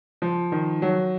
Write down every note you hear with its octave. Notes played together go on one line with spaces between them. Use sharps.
F3
D#3
F#3